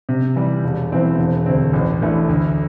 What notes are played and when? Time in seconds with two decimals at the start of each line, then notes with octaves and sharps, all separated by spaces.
0.09 C3
0.36 E3 G3
0.64 E1
0.91 E2 E3 C4 E4
1.19 E1
1.46 D2 D3 C4
1.73 A1
2.02 A2 E3 A3 D4
2.29 D2